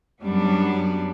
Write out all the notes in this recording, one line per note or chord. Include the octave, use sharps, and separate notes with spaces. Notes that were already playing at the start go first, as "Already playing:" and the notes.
F#2 G3 B3 D4